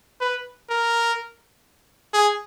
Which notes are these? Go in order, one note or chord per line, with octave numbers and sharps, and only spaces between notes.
B4
A#4
G#4